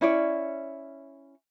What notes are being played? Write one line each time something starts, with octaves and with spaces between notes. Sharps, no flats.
C#4 E4 C#5 D5